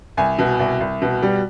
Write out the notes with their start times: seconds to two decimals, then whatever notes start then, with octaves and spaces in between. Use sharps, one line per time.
0.17 C2 G#5
0.38 B2
0.59 C2
0.80 C2
1.02 B2
1.22 G3